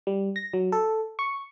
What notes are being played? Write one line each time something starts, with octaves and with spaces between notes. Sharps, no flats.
G3
A#6
F#3
A4
C#6